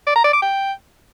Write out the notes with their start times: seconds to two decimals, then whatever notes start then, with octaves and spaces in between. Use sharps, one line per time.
0.07 D5
0.16 A#5
0.24 D5
0.33 D6
0.42 G5